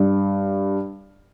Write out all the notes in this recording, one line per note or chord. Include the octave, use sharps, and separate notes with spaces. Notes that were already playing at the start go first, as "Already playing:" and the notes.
Already playing: G2